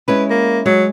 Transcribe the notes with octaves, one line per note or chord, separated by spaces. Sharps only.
G#3 C#4 E4 B4
A#3
F#3 G#3